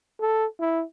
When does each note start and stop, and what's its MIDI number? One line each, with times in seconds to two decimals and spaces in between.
0.21 0.45 69
0.60 0.83 64